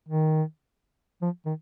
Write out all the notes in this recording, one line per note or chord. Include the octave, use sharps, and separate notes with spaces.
D#3
F3
D#3